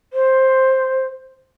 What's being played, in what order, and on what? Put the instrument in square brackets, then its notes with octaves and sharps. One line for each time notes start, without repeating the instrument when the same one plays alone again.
[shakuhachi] C5